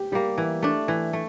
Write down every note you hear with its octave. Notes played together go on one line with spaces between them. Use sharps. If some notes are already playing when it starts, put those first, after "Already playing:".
Already playing: G4
G3 A#3 G4
E3
A3 D4
E3
A3